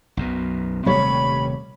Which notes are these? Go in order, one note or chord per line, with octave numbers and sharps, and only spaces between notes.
B1 F#2 B2
D#1 C3 G3 A3 C#5 B5